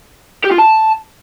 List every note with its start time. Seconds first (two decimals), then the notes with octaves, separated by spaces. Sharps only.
0.45 G4
0.52 F4
0.59 A5